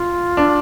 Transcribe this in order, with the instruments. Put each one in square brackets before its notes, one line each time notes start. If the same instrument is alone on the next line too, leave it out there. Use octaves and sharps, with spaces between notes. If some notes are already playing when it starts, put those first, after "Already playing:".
Already playing: [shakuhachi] F4
[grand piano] D4